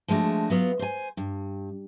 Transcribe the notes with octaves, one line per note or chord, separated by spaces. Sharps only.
F3 G#3 A3 D4 F#4
F#3 B3 F4
C5 G#5
G2